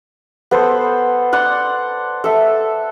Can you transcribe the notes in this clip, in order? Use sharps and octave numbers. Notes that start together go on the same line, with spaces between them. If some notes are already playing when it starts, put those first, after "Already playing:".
B3 A4 C5
D5 F#5 C6
A4 E5